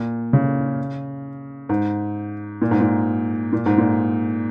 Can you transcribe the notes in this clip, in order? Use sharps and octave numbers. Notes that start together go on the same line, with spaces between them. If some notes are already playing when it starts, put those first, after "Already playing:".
Already playing: A#2
C#3
G#2
A#2
G#2
A#2
A#2
G#2
A#2